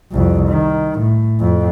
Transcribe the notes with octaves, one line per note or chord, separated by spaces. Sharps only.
C2 F2
D#3
A2
F2